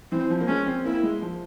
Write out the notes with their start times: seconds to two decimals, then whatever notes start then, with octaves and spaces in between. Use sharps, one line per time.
0.12 E3 C4
0.30 F3
0.40 A#3
0.48 G#3 C#4
0.66 C4
0.85 A#3 E4
1.03 G#3
1.21 F3